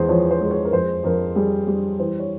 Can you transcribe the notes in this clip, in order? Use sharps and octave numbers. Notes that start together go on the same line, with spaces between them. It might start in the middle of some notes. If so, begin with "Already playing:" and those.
Already playing: E2 G#3 G#4 C5
F3 C#5
C5
G#3
C#5
A#4
F2 C5
F2 A#4
G3 G#4
G3 G4
E3 C5
C#5